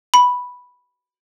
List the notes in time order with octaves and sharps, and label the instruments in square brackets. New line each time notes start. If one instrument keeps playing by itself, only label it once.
[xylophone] B5